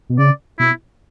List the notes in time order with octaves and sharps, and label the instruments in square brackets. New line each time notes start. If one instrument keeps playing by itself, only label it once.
[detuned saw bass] B2
[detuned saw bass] C#3 [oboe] D5
[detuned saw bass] B2 [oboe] E4